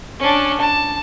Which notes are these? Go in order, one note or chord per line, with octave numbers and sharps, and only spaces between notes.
C#4 D4
A5